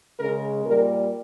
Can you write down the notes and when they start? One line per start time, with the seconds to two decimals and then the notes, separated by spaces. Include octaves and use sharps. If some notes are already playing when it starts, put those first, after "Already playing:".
0.19 C#3 G#3 A#4
0.65 A#2 G3 A#4